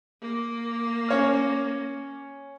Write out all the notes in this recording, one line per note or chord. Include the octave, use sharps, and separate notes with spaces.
A#3
C#4 C#5 F6